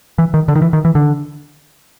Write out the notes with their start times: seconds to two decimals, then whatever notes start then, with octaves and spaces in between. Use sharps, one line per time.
0.18 E3
0.34 D#3
0.48 D3
0.55 D#3
0.62 E3
0.73 D#3
0.85 E3
0.95 D3